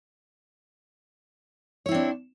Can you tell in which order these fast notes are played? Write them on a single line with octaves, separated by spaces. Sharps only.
C#5 E4 C4 D4